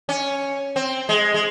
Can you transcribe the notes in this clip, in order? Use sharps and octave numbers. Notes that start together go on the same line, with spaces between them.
C#4
C4
G#3
G#3